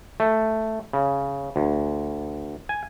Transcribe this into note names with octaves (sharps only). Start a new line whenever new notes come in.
A3
C#3
D2
G#5